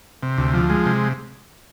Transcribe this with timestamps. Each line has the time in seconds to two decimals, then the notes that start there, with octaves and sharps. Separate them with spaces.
0.23 C3
0.38 D2
0.54 F3
0.70 G#3
0.86 C3